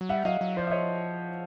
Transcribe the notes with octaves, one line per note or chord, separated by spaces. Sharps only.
F#3
G3 E5 F#5
F#3 D#5 F5
F#3
F3 C5 D5
E5
C#5 D#5